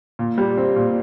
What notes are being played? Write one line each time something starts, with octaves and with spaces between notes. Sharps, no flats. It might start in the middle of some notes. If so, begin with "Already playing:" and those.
A#2
G3
C4
A#2